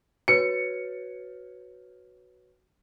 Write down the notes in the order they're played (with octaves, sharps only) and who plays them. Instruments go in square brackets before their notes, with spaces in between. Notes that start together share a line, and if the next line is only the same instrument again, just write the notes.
[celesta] F#4 B4 C#5 [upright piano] C#7